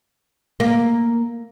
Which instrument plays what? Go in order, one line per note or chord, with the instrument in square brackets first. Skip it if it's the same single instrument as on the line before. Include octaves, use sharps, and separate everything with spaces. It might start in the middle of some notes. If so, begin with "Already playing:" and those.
[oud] A#3